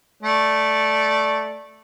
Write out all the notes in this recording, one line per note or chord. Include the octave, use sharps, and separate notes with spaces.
A3 D5